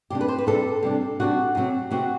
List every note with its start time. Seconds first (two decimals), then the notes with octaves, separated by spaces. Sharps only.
0.10 C3 G3 D4 G4
0.21 B4
0.28 C5
0.38 B4
0.47 C3 G3 D4 A4
0.83 C3 G3 D4
1.20 C3 G3 D4 F#4
1.55 C3 F#3 C4
1.91 C3 F#3 C4 F#4